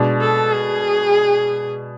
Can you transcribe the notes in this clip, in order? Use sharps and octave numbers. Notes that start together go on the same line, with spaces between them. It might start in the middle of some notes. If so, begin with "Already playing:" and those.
Already playing: B2 G#3 D4
A4
G#4